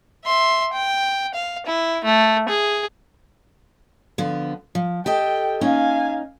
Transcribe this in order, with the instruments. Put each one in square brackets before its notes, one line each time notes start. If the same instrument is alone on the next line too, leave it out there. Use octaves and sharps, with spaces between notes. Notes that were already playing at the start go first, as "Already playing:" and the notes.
[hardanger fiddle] E5 C6
G5
F5
E4
A3
G#4
[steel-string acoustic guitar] D3 F3 B3
F3
[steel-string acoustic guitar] G4 A4 D#5 [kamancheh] G5
[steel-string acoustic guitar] A#3 C#4 D#4 [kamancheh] F5 G#5